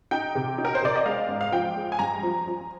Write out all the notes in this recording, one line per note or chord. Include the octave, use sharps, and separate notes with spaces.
D#4 G5
C3
D#4
A#4
C5
C3 D5
D#5
G#3 F5
G#2
F5
F3 G5
G#3
G#5
G2 A#5
F3
F3